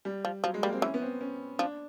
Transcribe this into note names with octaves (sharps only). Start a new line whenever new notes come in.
G3
F3
F3 F#3
G#3
G3 A#3
C4
E3 C#4
B3
C4
C#4
F3 D4